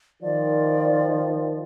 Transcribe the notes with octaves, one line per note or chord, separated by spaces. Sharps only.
D#3 F3 D5